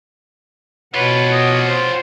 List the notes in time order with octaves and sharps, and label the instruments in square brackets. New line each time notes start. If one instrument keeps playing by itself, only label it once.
[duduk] B2 [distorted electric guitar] F4 G4 [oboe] B4 [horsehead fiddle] C#5 F#5
[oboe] D#5
C5